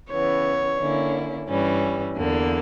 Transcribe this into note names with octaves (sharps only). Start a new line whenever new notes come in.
C#3 E3 B3 C#5
D3 A#3 C#4 E4
G2 E3 G3 C#4
E2 D3 A#3